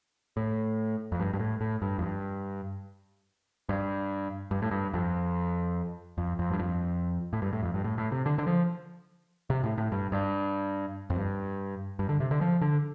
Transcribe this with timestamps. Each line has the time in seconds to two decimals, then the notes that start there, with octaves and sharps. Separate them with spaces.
0.37 A2
1.12 F2
1.20 G2
1.33 G2
1.40 A2
1.61 A2
1.82 G2
1.98 F2
2.02 G2
3.69 G2
4.51 G2
4.62 A2
4.71 G2
4.94 F2
6.18 F2
6.39 F2
6.50 G2
6.59 F2
7.33 A2
7.42 G2
7.53 A2
7.63 F2
7.74 G2
7.84 A2
7.98 A2
8.12 C3
8.26 D3
8.38 D3
8.47 F3
9.50 C3
9.63 A2
9.78 A2
9.92 G2
10.12 G2
11.10 F2
11.16 G2
11.99 G2
12.09 D3
12.20 C3
12.31 D3
12.41 F3
12.61 D3